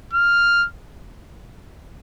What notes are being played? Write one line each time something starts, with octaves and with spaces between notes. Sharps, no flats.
F6